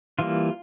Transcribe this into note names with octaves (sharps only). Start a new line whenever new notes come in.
E3 G3 A#3 F4